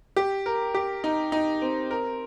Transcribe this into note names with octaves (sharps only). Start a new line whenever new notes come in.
G4
A#4
G4
D#4
D#4
C4
A#4